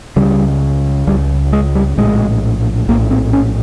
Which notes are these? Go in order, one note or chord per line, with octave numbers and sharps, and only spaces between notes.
C#2 C#3 G3
C#2 C#3 G3
G#3
G3
A#1 A2 G#3
A#1 A2 A#3
C4
C#4